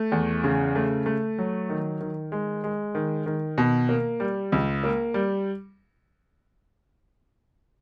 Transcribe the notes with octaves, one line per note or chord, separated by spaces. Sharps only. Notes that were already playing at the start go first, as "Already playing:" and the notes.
Already playing: A3
E2
C#3
A3
A3
F#3
D#3
D#3
G#3
G#3
D#3
D#3
B2
A#3
G3
C#2
A#3
G3